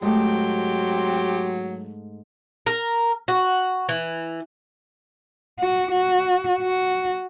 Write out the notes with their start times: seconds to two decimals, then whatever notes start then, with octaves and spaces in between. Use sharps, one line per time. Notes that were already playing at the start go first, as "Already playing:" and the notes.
0.02 G#2 F#3 A3 G4 G5 C6
2.66 A#4
3.28 F#4
3.89 E3
5.60 F#4
5.91 F#4
6.62 F#4